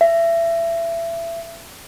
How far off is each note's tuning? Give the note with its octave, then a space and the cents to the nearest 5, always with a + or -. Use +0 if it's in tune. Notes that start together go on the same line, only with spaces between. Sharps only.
E5 +25